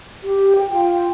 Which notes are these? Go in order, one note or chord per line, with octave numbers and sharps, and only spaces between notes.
G4
G5
F4 G5